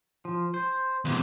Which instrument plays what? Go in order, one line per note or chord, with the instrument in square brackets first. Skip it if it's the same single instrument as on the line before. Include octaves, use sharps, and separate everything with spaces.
[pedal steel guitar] F3
C5
[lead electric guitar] E2 C3